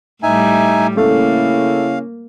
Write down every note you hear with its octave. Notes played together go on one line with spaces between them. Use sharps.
A2 G3 D#4 E5 G#5
C#3 A3 A#3 C#4 E4 F5